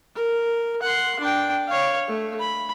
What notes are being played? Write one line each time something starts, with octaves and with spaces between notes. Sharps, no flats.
A#4
F#5 C6
D4 G5
C#5 F5
A3
B5